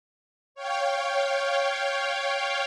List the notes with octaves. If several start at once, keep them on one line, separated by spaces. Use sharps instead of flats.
C#5 F5 G5